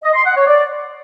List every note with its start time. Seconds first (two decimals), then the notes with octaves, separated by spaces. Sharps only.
0.03 D#5
0.14 C6
0.25 F#5
0.36 C#5
0.47 D5